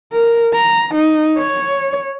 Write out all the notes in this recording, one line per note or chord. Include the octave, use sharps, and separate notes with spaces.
A#4
A#5
D#4
C#5